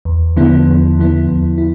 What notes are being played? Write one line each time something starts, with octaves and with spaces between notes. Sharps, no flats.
E2
D3 F3 B3 E4
E2
D3 F3 B3 E4
E2
E4